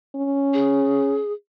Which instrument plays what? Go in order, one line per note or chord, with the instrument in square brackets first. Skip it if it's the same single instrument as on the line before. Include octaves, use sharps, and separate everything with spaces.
[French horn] C#4
[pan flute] G#4